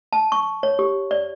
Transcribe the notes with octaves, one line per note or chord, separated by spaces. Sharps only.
A5
C#6
C#5
G4
D5